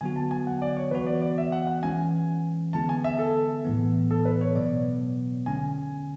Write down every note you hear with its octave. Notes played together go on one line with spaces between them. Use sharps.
D3 F#3 B3 F#4 G#5
A5
G#5
F#5
D5
C#5
E3 B3 F#4 B4
D5
D5
E5
F#5
F#5
E3 G#3 C#4 G#5
D3 G#3 B3 E4 G#4 A5
G#5
E5
A4
A2 E3 B3
A4
B4
C#5
B2 F#3 B3 D5
D3 G#3 C#4 G#5